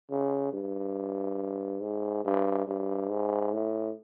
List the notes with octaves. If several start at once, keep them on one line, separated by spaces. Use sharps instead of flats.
C#3
G2
G#2
G2
G2
G#2
A2